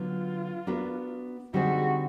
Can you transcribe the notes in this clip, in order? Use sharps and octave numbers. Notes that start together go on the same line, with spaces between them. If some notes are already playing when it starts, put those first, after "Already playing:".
Already playing: D3 F#3 B3 F4
B3 D4 F#4 A#4
D3 G3 C4 D#4 F#4 G#4